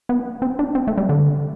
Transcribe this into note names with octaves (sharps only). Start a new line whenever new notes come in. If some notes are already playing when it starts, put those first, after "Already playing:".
B3
C4
D4
C4
A3
G3
D3